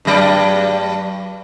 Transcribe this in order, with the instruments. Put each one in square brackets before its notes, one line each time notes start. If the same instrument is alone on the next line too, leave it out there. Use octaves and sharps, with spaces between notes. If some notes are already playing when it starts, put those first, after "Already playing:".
[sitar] G2 F#3 D5